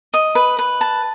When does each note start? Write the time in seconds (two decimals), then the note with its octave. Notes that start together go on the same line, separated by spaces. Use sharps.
0.14 D#5
0.35 B4
0.58 B4
0.81 A5